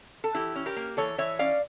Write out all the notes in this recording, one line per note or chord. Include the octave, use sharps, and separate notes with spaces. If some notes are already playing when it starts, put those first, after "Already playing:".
A4
E3 E4 G4
C#4
G4 A#4
A#3
E3 A4 C#5
E3 C#5 E5
C#4 D5 F5